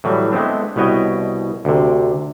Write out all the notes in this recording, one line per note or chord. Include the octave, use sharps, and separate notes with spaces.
A2 E3 F#3 G3
G#3 A3 B3 C4 D4
C2 B2 B4 C#5 D#5 G5
D2 C3